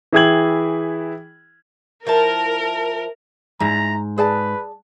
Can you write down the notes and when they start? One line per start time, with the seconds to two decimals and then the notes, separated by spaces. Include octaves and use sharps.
0.13 E3 E4 G#4 G5 G#6 F#7
2.07 F3 E4 A#4 A5
3.60 G#2 D4 E4 A#5
4.18 G#4 B4 D5 A5